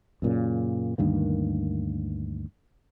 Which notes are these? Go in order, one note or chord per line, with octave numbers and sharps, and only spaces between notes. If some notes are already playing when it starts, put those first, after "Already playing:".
F#2 A#2 C#3
D2 G2 D#3 A#3